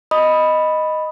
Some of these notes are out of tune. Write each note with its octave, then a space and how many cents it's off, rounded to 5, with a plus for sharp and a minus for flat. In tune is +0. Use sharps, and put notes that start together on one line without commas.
D#5 +0 B5 +0 D#6 +0